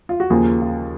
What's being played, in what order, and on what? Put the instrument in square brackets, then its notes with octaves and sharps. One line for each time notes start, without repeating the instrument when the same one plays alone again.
[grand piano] F4
F#4
D#2 C#3 F3 A#3 G#4
F4